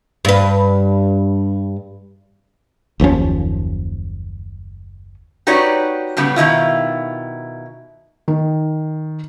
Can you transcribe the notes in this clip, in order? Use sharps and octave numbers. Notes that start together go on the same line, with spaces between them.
G2 B4
F#1 D#2 F3 C#4
D#4 F#4 G4 B4 C#5 D5
A2 C#3 G3 B3
B2 D#3 E4 F4
D#3